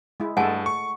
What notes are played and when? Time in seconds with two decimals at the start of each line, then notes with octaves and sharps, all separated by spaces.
0.20 G#3 E4
0.37 G2 G#3 A3 A4 F#5 G#5 A5
0.66 C#6